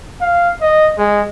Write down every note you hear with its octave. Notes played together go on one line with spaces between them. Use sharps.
F5
D#5
G#3